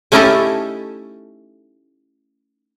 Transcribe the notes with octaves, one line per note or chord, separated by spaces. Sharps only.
A3 C#4 D#4 E4 G4 A4